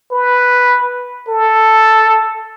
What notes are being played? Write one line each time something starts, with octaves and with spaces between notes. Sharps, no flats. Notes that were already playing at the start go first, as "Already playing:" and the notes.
B4
A4